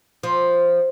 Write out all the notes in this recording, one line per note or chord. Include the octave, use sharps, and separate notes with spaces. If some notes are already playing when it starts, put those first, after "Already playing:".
F3